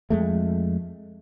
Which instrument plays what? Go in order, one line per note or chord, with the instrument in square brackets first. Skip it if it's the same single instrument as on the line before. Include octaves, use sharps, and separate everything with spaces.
[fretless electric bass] F2 G#3 A3